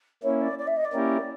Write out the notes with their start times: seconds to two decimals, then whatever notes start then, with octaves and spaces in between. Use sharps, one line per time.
0.23 A#3 C#4 E4 C#5
0.41 D5
0.58 D5
0.67 E5
0.76 D#5
0.84 D5
0.93 A#3 C#4 E4 G4 A#4